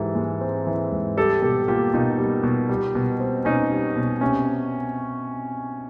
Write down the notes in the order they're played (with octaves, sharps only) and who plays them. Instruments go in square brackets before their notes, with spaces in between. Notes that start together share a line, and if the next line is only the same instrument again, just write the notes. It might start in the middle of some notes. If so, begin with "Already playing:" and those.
Already playing: [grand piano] G#2 E3 G4 A4
G#3
C4
E3
G#2
G3 G4 A4
B2 G4 A4
A#3 F4 G4
B2 D#4 F4
G3
B2
G3
B2
C4
B2 C#4 D#4
G3
B2
C3 C#4